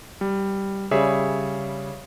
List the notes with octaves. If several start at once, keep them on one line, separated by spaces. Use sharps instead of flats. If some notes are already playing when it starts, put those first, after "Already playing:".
G3
C#3 G3 G#4 C#5 E5